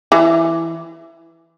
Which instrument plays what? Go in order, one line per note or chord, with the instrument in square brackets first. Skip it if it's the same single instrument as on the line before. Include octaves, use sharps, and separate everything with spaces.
[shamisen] E3